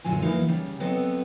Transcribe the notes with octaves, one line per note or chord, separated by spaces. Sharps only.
F#2 A#2 D3 F#3 G#5
E3 F#3 A#3 D#4
C#3 G3
F#3 B3 C4 A4 D#5 F#5